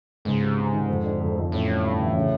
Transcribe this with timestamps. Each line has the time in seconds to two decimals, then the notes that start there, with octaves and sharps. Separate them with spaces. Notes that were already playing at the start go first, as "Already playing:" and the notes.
0.25 C#2 G#2
0.41 C3
0.57 C3
0.73 D#3
0.88 F2
1.04 D3
1.20 F2
1.36 F2
1.52 A1 A2
1.68 G2
1.83 G2
2.00 E3
2.16 C#3